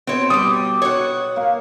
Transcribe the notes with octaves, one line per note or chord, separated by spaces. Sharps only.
B2 C4 C#5
G3 G4 D#6
F#4 C#5
A#3 F5